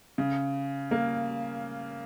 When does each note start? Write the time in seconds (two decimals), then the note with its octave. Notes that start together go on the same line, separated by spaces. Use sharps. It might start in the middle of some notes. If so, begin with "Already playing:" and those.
0.18 C#3
0.91 A#3